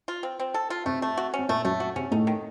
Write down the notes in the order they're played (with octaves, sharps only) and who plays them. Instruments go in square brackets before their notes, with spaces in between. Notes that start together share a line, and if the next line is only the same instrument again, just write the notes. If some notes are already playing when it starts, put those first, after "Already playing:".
[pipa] F4
C4
C4
A4
F4
[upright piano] C3 C4 [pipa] A3
[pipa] A3
F#4
C#4
[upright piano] C4
[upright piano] A#2 A#3 [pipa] A3
[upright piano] F#2 F#3 [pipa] A3
[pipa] F#4
[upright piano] C3 C4 [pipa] C#4
[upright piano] A2 A3 [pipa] D#4
[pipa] D#3